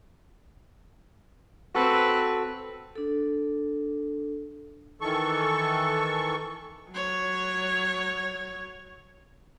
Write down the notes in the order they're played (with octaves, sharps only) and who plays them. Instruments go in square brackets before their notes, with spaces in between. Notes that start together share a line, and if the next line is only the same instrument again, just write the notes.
[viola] C4 B4 [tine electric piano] F#4 A4
[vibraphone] D4 A4
[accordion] D#3 E3 A4 C#6
[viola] F#3 C#5